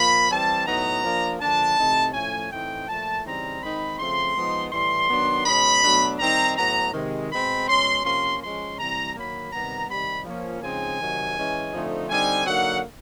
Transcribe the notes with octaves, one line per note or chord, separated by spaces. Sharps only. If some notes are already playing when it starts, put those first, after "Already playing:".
Already playing: A#2 F3 A#3 B5
E3 G3 C4 A5
A2 F#3 B3 D#4 A#5
F3 A#3 D4
D3 F3 A#3 D4 A5
C3 E3 A3 C4 D#4
A2 F3 A3 C#4 G#5
A2 E3 A3 C4 D#4 G5
A#2 F3 A3 A5
C#3 E3 G3 C4 D#4 A#5
D#3 G#3 C4 D#4 B5
C#3 F3 A3 C4 C6
F3 G#3 B3 D#4
A2 E3 G3 C6
D#3 F#3 B3 D4
B2 G#3 C#4 B5
B2 F#3 A3 D4
D#3 G3 C4 D#4 A#5
A2 F#3 B3 A#5
C3 D#3 G#3
B2 G#3 C4 B5
B2 G#3 C#4 C6
C3 F3 A#3 C#4 C6
F3 G#3 C#4 C6
C3 E3 G3 C4 A#5
D#3 F#3 A#3 B5
C3 D#3 G3 B3 A#5
C3 D#3 G3 B5
F3 A#3 C#4
C#3 F3 G#3 C4 D#4 G#5
C3 D#3 F#3
E3 G#3 C#4
D3 F3 A3 C4 D#4
D3 G3 C4 D#4 G#5
D3 F#3 A#3 D#4 F#5